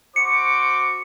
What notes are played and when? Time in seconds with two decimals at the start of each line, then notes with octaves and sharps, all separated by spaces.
0.16 F#4 C5 D6 C#7